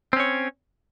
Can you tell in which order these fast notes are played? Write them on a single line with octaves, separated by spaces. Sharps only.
C4 C#4 C#5